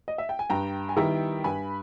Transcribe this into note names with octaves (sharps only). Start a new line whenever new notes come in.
D#5
E5
G5
G#5
G2 G5 A#5
G#5
D#3 G3 B3 E4 G5 A#5
G2 G#5 B5